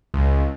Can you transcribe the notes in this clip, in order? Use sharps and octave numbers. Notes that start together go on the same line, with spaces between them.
C#2